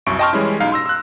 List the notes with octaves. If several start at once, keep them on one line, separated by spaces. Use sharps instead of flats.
C2 F#2 C#6 D7
D#5 G5 A5 C6 C#6 F6
E3 G3 G#3 C#4 E4
B1 D#4 F5
C6 E6 A#6
E6 F#6